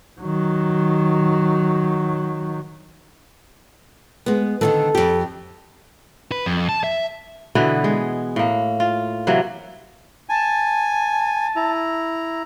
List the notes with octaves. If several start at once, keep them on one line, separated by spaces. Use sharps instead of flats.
D#3 F#3
G#3 B3
D3 D#3 F#3 A4
F2 G4
B4
F2
A5
E5
B2 D3 E3 B3
G#3
A2 A#3
F4
C3 E3 F#3 A#3
G#5 A5
E4 A#5